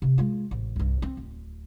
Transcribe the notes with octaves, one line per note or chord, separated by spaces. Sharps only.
C3 F3
G#3 F4
A1
C2 G2
C4
D1